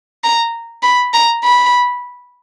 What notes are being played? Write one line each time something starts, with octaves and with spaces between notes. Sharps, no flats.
A#5
B5
A#5
B5